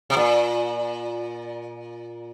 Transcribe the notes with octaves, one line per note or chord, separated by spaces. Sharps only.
C3
A#2